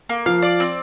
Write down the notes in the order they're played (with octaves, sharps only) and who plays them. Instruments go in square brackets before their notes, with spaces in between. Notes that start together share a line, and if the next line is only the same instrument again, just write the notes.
[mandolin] A#3
[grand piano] F3 [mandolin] F5
[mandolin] D5
C4